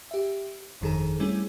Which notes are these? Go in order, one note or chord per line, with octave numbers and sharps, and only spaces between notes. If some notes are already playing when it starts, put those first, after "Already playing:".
G4 E5
G1 F2 D#3 G#4 A4
G3 A3 C4 C#4 E4 G#4